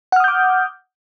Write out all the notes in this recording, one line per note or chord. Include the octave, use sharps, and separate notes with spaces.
F#5 D6 D#6 F6 G6